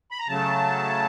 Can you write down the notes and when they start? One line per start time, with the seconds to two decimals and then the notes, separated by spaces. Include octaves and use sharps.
0.11 B5
0.19 A#5
0.28 C#3 F#3 A3 A5